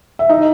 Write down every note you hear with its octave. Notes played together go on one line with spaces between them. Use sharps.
E5
D#4 D#5